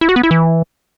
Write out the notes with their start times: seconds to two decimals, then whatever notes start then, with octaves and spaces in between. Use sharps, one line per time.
0.01 E4
0.09 F#4
0.16 B3
0.23 E4
0.31 E3